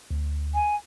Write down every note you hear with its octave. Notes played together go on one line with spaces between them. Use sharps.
D2
G#5